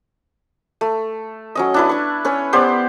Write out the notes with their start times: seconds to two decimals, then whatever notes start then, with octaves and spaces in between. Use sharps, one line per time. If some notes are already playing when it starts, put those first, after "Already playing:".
0.81 A3
1.55 F#3 C#4 D#5
1.74 D4 E4 B4
1.89 D4 C#6
2.25 C#4 B4 C#5
2.53 B3 G4 C5 D5